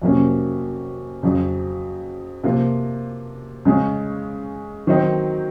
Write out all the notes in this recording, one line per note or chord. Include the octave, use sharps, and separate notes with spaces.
F2 C3 F#3 A#3 C#4
F2 C#3 F#3
C3 F3 A#3 F4
C#3 G#3 C#4
D#3 F#3 C4 D#4